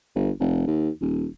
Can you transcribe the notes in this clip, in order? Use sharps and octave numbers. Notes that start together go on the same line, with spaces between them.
G1
F1
D#2
D#1